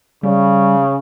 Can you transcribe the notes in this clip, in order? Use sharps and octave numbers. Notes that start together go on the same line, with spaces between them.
C#3 G3